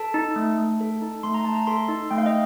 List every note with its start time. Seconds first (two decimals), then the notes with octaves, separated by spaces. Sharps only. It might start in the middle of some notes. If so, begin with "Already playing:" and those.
Already playing: A4 A5
0.14 D#4
0.36 A3
0.58 A3
0.81 A4
1.02 D#4
1.23 A3 C6
1.34 A#5
1.44 A3 A5
1.55 A#5
1.67 A4 C6
1.88 D#4
2.11 A3 G5
2.18 F5
2.26 D#5